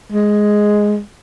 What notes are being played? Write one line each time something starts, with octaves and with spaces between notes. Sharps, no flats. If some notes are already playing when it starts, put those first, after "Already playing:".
G#3